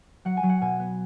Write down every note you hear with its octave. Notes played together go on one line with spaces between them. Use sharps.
F#3 F#5
G#5
F#3
F#5
B2 G#5
B3